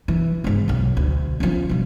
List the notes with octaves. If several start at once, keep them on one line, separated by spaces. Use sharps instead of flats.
E3
C#2 G#2
B1 F2
D2
F3 C#4
B2 G3